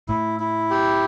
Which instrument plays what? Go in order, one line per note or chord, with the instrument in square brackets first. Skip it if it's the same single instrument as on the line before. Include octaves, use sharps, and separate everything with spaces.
[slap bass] A2 [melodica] E4
[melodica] E4
G4